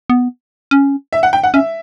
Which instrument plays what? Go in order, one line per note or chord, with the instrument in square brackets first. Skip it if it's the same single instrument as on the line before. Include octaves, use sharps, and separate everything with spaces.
[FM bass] B3
C#4
[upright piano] E5
F#5
G5
F#5
[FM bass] C#4 [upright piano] E5